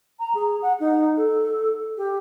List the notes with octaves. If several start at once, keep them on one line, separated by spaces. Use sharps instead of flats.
A#5
G#4
F#5
D#4
A4
G4